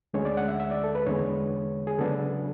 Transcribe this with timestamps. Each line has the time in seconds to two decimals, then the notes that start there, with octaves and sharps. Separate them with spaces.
0.13 D2 D3 G#3 C#4 C#5
0.25 D5
0.37 F#5
0.48 E5
0.60 E5
0.71 D5
0.84 A4
0.95 B4
1.06 E2 D3 G#3 B3 C#5
1.87 G#4
1.98 C#3 F#3 B3 D4 A4